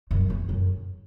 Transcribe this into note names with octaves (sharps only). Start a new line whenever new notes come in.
F#2
E2
F#2